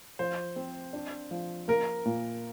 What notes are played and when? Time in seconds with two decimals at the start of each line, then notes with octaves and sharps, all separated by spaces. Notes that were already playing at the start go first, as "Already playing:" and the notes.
0.19 F3 C5
0.56 C4
0.93 D4
1.31 F3
1.68 A#3 A#4
2.06 A#2